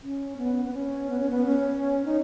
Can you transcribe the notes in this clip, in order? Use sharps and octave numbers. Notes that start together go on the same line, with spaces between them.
C#4
B3
B3
C#4
B3
C#4
B3
C#4
D#4